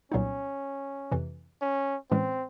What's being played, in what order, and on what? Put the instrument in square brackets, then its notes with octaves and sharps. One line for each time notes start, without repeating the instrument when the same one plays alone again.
[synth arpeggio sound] C2 A#2 F#3 B3 D#4 [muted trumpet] C#4
[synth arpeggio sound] F2 C3 E3
[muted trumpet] C#4
[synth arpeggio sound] A2 E3 G#3 C#4 [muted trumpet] C4